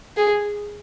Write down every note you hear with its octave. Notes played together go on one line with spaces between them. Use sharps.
G#4